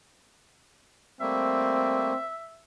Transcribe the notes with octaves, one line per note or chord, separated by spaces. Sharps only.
G3 A3 A#3 C4 E5